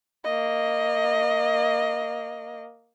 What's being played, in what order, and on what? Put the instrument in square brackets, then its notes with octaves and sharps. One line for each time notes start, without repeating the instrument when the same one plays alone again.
[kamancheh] A#3 D#5